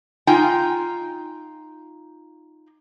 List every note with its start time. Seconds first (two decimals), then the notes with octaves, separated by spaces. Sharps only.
0.27 D#4 F4 G5 G#5